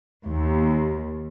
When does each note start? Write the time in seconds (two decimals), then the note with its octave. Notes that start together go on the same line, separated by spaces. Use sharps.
0.24 D#2